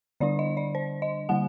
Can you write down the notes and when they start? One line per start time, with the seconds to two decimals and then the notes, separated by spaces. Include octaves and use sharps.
0.20 D3 G3 D4 D5
0.39 D#5
0.57 D5
0.75 C5
1.02 D#5
1.29 D3 G3 A#3 F#5